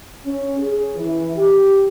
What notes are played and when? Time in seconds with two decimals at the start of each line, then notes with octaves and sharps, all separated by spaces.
0.24 C#4
0.57 G#4
0.96 E3
1.36 G4